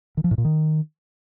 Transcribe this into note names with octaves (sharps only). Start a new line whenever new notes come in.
D#3
F3
A2
A#2
D#3